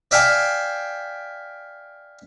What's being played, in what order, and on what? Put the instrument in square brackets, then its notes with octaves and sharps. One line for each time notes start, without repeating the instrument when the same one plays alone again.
[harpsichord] D5 E5 F5 G5 G#5